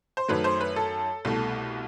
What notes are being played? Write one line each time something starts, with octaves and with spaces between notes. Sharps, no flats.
C5
F#2 D#3 F#3 A3 B4
C5
B4
A4
C2 B2 A3